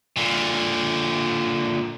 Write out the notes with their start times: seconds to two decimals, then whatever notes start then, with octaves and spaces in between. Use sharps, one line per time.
0.16 A#2 D3